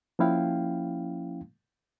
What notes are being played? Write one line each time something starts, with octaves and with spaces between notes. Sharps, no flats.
F3 A#3 C#4 E4 F5 G5